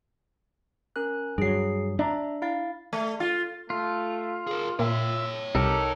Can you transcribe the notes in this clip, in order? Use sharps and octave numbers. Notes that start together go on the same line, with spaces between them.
C#4 A#4 F#6
G2 F#3 G#4 C7
D4 E5 A#5
E4 F5 A6
A3
F4
A3 F4
G#4 A#4
A#2 C#5 E5 G5
C2 D#4 G4 A4 A#4